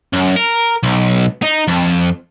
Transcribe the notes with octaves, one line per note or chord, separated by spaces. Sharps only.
F#2
A#4
B1
D#4
F2